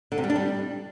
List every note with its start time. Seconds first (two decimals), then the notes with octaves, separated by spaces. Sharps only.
0.12 D3
0.18 C3
0.24 G3
0.30 D4
0.36 G3